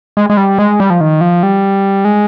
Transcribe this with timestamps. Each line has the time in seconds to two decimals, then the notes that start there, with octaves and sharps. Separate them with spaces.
0.17 G#3
0.30 G#3
0.37 G3
0.58 G#3
0.80 G3
0.90 F3
1.01 D#3
1.21 F3
1.43 G3
2.05 G#3